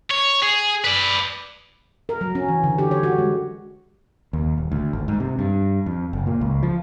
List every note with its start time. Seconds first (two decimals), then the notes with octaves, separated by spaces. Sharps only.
0.11 C#5
0.43 G#4
0.85 B4 D5
2.09 A#4
2.21 F#3
2.35 C#4
2.48 E3
2.64 D3
2.78 G4
2.91 C#5
3.03 F#4
3.18 G#3
4.33 D#2
4.58 D#1
4.72 D2
4.93 G#1
5.08 G#2
5.20 C3
5.39 G2
5.86 F2
6.13 F#1
6.27 A#2
6.41 C#2
6.63 F3